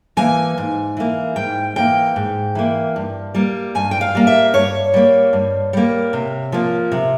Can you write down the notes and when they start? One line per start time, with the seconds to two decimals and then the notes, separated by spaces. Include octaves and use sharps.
0.17 E3 A#3 G#5
0.58 G#2
0.97 E3 A#3
1.36 G#2 G5
1.76 E3 A#3 G5
2.16 G#2
2.55 E3 A#3
2.96 G2
3.35 G3 A#3
3.75 G2 G#5
3.91 G5
4.01 F5
4.15 G3 A#3
4.27 E5
4.54 G2 C#5
4.94 G3 A#3
5.33 G2
5.73 G3 A#3
6.13 C3
6.52 F3 A#3
6.92 C3